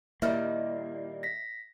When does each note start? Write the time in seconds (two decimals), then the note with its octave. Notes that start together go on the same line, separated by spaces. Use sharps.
0.22 A#2 D#3 G3 A#3 E4 D5 E5 F6
1.23 A#6 B6